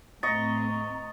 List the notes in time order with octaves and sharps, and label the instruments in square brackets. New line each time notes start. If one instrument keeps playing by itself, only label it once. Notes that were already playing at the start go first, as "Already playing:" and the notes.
[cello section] A2 A3 C4 [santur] D#5 C#6 [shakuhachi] A#5 [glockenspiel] A6